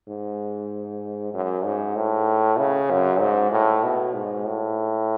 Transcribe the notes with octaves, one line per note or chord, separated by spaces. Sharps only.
G#2
F#2
G#2
A2
C#3
F#2
G#2
A2
B2
G#2
A2